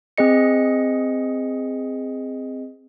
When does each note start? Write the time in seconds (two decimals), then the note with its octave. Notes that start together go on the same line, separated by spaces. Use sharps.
0.18 C4 G#4 D#5 C#7